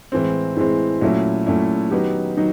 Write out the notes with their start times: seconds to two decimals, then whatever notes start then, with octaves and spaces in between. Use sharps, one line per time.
0.12 A2 E3 G#3 C4
0.57 A2 E3 G#3 C4
1.01 A#2 F#3 A3 C#4 E4
1.46 A#2 F#3 A3 C#4 E4
1.91 D#3 F#3 B3 D#4 G4
2.37 D#3 F#3 D#4